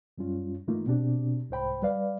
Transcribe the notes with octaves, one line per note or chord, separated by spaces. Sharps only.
F#2 G3 C#4 F4
G#2 E3 A3 A#3 D#4 F4
B2 C4 D4 G4
C2 G#2 C5 G5 B5
G3 B4 D5 F5